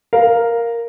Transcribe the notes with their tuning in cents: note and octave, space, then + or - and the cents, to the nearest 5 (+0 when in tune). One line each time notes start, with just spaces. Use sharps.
A#4 +0 F5 +0